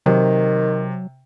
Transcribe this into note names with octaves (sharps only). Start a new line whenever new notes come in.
C3 D#3 F#3